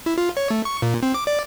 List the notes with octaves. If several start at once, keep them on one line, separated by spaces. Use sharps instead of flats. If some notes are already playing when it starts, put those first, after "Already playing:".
E4
F4
C#5
A3
C#6
A#2
C4
D6
D5